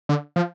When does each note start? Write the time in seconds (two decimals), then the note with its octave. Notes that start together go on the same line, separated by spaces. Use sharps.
0.09 D3
0.36 F3